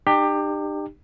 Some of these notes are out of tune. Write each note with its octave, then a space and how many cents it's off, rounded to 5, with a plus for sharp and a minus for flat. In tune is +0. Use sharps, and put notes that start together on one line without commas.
D#4 -45 G4 +15